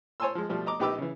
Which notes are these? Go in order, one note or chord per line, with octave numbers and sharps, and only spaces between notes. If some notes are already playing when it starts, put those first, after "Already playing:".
C5 C#5 G#5 A5 C6 E6
F3 G#3
B2 F3 G3 A3
D#5 A#5 D6
A#1 D#4 G4 B4 D6 E6
C#3 E3